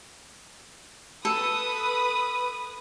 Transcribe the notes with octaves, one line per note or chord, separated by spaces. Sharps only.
A4 B4 B5 D#6